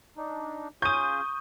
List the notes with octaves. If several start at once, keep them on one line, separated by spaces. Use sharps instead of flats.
D4 D#4
C#4 F4 G#4 C#6 D#6 G6 D#7